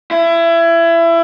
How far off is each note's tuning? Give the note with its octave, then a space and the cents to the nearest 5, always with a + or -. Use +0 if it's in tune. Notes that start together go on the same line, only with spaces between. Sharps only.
E4 +25